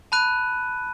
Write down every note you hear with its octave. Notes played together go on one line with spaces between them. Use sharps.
A5 B5 F#6 D#7